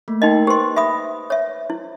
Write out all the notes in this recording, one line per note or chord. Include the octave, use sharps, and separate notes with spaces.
A3 A#3
D#4 A#4 D#5 G5 C6
G4 B4 C5 C6
E5 B5 D#6
C#5 E5
E4